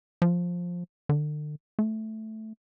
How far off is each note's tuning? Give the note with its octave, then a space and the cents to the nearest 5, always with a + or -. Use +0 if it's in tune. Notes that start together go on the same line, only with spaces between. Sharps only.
F3 +10
D3 +35
A3 -5